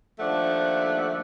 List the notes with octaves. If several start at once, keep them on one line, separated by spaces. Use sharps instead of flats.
D#2 F3 A3 D4 F#5